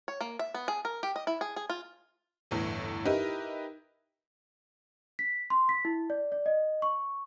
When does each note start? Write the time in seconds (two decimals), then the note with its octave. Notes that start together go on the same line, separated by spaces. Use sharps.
0.08 C#5
0.21 A#3
0.39 E5
0.54 B3
0.68 G#4
0.85 A#4
1.03 G4
1.16 D#5
1.27 E4
1.41 G#4
1.56 G#4
1.70 F4
2.51 G1 E2 A2 E3
3.05 D#4 E4 G4 A#4 B4 D#5
5.19 B6
5.50 C6
5.69 B6
5.85 E4
6.10 D5
6.32 D5
6.46 D#5
6.82 C#6